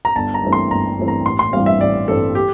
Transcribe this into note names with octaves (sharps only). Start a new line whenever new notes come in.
A#5
G1 A5
A#5
G2 E3 A3 C4
C6
G1 A#5
G2 E3 A3 C4
A#5
A1 C6
C6
G2 E3 G3 C4 F5
E5
A1 D5
G2 E3 G3 C4 A4
G4